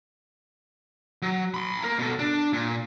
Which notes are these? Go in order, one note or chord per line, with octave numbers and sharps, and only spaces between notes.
F#3
B5 C6
A#3 A#4
B2 A4
D4
A#2